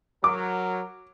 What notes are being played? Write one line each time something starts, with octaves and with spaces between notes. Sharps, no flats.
F#3 A#4 D6